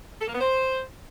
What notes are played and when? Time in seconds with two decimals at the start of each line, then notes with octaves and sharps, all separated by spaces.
0.21 A4
0.28 A#3
0.34 B3
0.41 C5